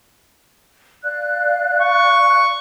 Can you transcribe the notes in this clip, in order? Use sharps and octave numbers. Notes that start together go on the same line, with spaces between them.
D5 F5 F#6
C#6